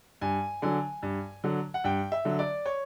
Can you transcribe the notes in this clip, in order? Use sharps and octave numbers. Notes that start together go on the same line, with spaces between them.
G2 G#5
D3 F#3 G#5
G2
D3 F#3
F#5
G2 G5
E5
D3 F#3
D5
C#5